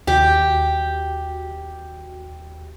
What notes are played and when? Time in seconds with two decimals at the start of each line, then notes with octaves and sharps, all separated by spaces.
0.07 D#2 F#4 G4